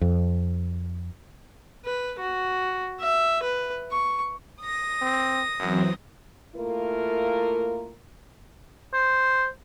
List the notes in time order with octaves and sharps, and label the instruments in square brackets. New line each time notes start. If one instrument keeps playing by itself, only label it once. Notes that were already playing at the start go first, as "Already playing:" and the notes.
[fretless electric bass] F2
[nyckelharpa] B4
F#4
E5
B4
C#6
[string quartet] D#6 A#6
[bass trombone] C4
[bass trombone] F#2 [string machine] E3 F#3 C4
[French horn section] A3 A#3 E4 F4 A#4
[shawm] C5